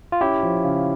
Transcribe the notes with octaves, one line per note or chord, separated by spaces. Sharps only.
F4
C#4 E4 G4
F3
C#3